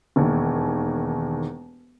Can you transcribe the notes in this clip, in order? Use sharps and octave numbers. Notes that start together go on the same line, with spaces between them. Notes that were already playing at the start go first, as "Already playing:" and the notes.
E1 D#2